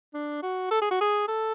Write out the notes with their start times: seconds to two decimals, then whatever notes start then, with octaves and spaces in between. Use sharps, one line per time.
0.14 D4
0.43 F#4
0.71 A4
0.82 G#4
0.91 F#4
1.01 G#4
1.28 A4